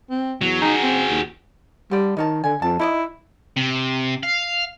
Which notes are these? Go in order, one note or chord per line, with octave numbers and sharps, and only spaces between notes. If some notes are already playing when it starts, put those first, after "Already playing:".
C4
E2 F#3
D#4 F#4 G#4
C4
D#2
D3 G3 D5
D#3 D#4 C#5 A5
D3 G#5
F2 A5
D#4 E4 D5 D#5
C3
F5